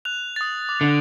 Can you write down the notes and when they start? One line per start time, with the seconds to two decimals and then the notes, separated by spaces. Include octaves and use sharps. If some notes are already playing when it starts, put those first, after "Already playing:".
0.05 F#6 F7
0.36 D#6 A6
0.69 D6
0.81 D3